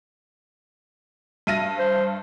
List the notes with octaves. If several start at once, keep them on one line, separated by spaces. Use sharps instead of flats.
G2 E5 F6 A#6 D#7
C5